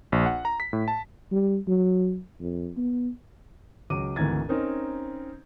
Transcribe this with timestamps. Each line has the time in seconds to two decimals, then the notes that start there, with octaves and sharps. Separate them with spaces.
0.12 A#1
0.26 F#5
0.45 A#5
0.60 B6
0.73 A2
0.88 A5
1.32 G3
1.68 F#3
2.41 F2
2.77 B3
3.90 C#2 F#3 D6 D#7
4.16 G#1 D2 E3 A#5 G#6 A6
4.49 C4 C#4 D#4 A#4